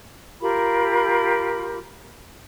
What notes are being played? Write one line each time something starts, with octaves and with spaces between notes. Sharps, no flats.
F4 G4 A#4 B5